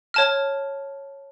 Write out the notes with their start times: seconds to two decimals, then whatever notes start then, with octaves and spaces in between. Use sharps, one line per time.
0.14 C#5 A5 F6